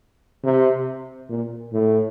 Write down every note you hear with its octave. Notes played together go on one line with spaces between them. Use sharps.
C3
A#2
A2